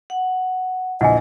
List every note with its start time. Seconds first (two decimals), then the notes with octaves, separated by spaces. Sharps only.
0.10 F#5
1.01 A#1 E2 D#5 F#5 G#5